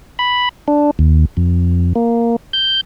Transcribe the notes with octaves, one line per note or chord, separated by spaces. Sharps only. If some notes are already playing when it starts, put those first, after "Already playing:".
B5
D4
D#2
F2
A#3
G6